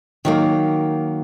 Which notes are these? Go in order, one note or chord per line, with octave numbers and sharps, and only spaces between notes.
D#3 F#3 A#3